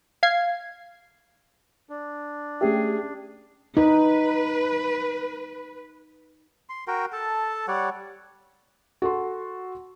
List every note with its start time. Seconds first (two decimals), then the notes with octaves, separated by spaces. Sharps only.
0.23 F5 G#6 C7
1.89 D4
2.61 A3 C#4 G4 G#4 E5
3.77 D#4 B4
6.69 C6
6.88 F#4 A#4 G5
7.13 A4 A5
7.68 G3 C#5 D5 F#5
9.02 F#4 A4 C6